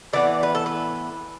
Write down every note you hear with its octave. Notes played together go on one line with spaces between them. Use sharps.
A2 E3 B3 D5
B4
A4
B4